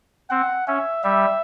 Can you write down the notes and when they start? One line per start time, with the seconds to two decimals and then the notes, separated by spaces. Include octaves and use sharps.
0.30 C4 F#5
0.67 C#4 E5
1.04 G3 E5